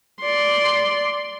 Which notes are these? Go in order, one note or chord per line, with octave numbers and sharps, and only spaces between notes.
D5 C6